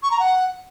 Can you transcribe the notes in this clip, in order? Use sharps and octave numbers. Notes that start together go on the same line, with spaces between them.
C#6
A#5
F#5